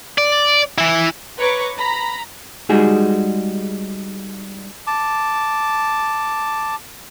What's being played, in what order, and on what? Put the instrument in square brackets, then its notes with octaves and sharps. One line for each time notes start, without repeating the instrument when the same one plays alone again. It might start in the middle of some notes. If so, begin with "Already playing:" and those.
[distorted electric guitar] D5
E3 E4
[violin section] B4 C#5 A#5 C#6 D6
A#5 B5
[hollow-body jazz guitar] G3 G#3 D#4 F#4 G#4
[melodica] A5 D6